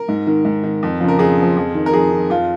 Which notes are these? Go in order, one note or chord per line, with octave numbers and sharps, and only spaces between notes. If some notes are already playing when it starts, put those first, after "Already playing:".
Already playing: A#4
G#2
D#3
G#2
D#3
F2
C#3 F3
A#4
F2 G#4
C#3 F3
F2
D#3
A#4
F2 G#4
D#3
F2 F4